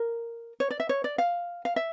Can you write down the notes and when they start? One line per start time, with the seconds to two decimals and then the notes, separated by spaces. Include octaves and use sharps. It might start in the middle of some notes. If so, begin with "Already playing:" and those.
Already playing: A#4
0.60 C#5
0.71 D5
0.80 E5
0.89 C#5
1.04 D5
1.18 F5
1.65 F5
1.76 E5